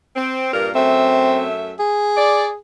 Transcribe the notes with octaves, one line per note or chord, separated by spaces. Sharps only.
C4
G2 A#2 A#4
F#2 A3 C4 E5
G#4
D5